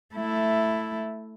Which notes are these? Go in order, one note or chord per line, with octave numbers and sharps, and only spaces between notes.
A3 E4